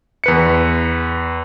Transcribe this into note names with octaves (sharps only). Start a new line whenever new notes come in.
E2 B4 C#7